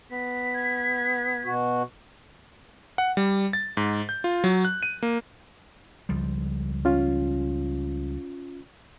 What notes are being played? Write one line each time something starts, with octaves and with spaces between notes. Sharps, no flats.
B3 B6
G#6
B2 F#4
F#5
G3
A6
G#2
G6
F4
F#3
F#6
D#7
A#3
C#2 F3 G3
C#4 F4